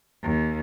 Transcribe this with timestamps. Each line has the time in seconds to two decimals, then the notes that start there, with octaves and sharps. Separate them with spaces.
0.23 D#2